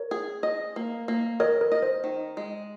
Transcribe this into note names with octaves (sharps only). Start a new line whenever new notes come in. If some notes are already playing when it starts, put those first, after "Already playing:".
Already playing: A#4 C#5
G#4
D#5
A#3
A#3
A#4 C#5 D#5
A#4
D#5
C5
D#3
G#3